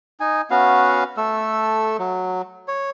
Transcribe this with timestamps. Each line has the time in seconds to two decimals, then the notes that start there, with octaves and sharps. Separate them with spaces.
0.20 D#4 G#5
0.51 B3 C#4 F#4 F5
1.17 A3 A4 E6
1.99 F#3
2.68 C#5